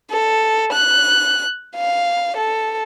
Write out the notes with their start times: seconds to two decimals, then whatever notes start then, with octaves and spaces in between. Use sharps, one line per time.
0.11 A4
0.73 F#6
1.76 F5
2.37 A4